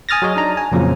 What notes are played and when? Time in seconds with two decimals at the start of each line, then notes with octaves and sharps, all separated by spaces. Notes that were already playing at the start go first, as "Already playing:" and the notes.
0.09 G#5 D#6 F6 A6 A#6
0.22 F#3 G#4 C#5 D#5
0.36 D4 D#4 A#5
0.57 G#5
0.72 F2 A#2 C#3 F3 F#3